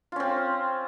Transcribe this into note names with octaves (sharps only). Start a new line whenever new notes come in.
C4 C#4 F4